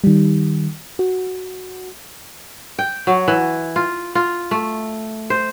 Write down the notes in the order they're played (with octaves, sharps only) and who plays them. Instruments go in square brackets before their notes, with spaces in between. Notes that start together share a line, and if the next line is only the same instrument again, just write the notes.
[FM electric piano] D#3 G3
F#4
[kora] G5
F#3
E3
F4
F4
A3
C5